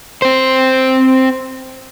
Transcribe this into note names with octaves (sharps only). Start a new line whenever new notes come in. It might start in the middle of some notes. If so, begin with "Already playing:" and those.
C4 C5